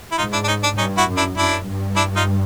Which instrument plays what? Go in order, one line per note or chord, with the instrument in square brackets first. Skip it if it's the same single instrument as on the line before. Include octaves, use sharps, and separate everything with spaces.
[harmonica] E4
[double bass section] G#2 [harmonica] D#4 F4
[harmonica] D4 E4
D4
C#4 D#4
D4
[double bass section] G2 [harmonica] C#4 D#4
[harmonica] E4 F#4
[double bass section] F#2
[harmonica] D4 E4
[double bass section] F#2 [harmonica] D4 E4
[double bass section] G2
[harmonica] D4 E4
D#4 F4